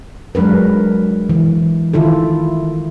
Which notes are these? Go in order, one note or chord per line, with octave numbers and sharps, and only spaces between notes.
F#3 G#3 D4 A#4 B4
E3
D#3 E4 F4 A4